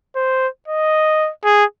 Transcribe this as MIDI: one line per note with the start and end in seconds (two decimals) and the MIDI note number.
0.16 0.48 72
0.68 1.31 75
1.44 1.65 68